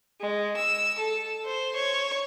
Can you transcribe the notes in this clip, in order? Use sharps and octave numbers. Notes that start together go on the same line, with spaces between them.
G#3
E6
A4
C5
C#5